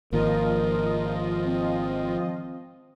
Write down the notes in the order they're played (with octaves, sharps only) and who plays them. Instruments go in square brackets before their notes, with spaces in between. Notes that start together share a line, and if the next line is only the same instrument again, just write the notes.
[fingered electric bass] G#1 D#3 A#3 [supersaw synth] F3 F4 D#5 [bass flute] A#4
[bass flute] C4